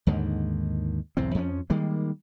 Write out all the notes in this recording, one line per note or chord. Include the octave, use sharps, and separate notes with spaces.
D#2 G#2 D3 D#3
B1 E2 G#2 C4
F2 F3 G3 C#4
D#3 G3 G#3 A#3